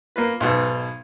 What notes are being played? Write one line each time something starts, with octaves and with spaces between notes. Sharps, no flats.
A#3 F4 B4
B1 G#2 B2